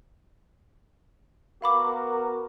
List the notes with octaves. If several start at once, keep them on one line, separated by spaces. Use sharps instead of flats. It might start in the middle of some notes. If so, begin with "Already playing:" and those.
B3 F#4 A#4 F5 B5 D6